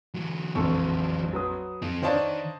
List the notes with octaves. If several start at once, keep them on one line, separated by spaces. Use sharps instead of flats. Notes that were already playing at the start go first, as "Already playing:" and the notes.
E3 F#3
E1 A#1 F2 A4 C#6
F#3 B4 D#6
F2 C4 F4
D#3 D4 C5 C#5 D#5 F5 A5